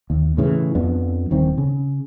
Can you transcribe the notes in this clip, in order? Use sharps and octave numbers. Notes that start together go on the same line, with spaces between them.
D#2
A2 C#3 E3
F2 B3 D4
D#1 D#3 C4
C#3